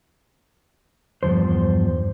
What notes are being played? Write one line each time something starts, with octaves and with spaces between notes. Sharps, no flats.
E2 G2 B2 F3 C5